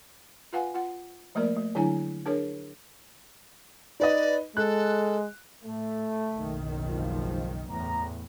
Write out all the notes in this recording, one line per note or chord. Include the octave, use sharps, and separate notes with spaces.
F4 B4 F5 F#5 G#5
F4 F#5
F3 A3 A#3 A#4 D5
A3
D3 F#3 D4 E4 G#5
D4 G#4 A#4 C#5
D#4 B4 D5 D#5
G#3 A4 F#6
A2 A3
F#1 B1 D#3
G#2 F3
E2 A2 A#5